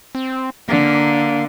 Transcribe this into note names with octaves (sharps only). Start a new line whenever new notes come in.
C4
D3 A#3